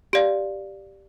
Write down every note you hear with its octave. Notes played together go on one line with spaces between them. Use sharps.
G4 D5 F5